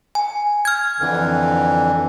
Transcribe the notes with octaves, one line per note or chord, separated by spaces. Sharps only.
G#5
F6 G#6
F2 D3 E3